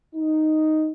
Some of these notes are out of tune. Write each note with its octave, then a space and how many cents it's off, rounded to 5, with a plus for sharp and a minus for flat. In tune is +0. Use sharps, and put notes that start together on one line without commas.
D#4 +0